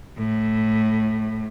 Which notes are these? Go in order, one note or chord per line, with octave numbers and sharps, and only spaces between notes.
A2